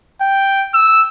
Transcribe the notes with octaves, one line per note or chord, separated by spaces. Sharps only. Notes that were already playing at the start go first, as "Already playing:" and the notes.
G5
E6